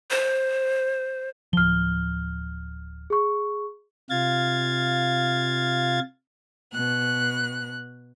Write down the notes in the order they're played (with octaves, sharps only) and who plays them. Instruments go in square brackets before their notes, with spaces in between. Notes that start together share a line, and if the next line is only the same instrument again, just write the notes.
[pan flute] C5
[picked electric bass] D1 F3 [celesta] F6 G7
[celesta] G#4 C#6
[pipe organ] C3 F4 F5 G#6 A6
[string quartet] B2 F#6